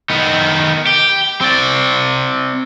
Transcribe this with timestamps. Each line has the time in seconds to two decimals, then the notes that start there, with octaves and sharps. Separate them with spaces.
0.10 D#3 B3
0.87 G4
1.41 C4 D5